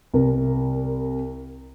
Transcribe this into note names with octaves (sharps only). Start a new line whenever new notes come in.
C2 A#4